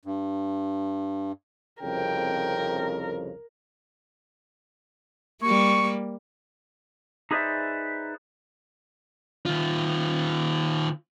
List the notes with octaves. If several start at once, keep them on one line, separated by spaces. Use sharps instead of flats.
G2
C2 F2 C#3 A#4 G5
G3 A#3 C#6
D#4 G#4 B4 C5 D5 E5
D#3 F4